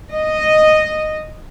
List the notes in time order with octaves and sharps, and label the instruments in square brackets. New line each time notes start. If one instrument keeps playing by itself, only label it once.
[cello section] D#5